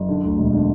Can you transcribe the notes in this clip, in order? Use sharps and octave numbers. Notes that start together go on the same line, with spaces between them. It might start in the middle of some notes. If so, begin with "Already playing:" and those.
Already playing: F#1
D3
D2
E1
D3